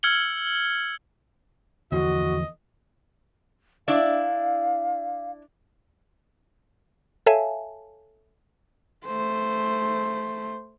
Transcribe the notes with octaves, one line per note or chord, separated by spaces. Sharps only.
E6 F6 G#6 C#7 F#7 G7
E2 D3 F3 F#4 D#5
D4 E4 D5 F5
A4 C#5 E5 F5 G#5 A5
A3 C5